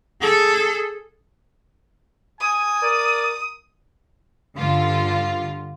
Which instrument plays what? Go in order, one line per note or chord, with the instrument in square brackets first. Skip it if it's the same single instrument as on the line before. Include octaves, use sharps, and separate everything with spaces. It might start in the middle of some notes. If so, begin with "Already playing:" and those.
[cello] G#4 A4
[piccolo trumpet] G#5 [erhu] D#6
[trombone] A#4 [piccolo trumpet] D5
[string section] G2 D3 F4